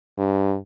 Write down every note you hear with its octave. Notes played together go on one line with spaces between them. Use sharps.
G2